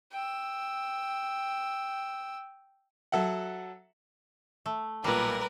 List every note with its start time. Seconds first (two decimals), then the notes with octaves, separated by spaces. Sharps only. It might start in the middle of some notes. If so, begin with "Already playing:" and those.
0.12 G5 E6
3.12 F#3 A4 E5 F#5
4.66 A3
5.04 B1 A#2 G3 A#4 B4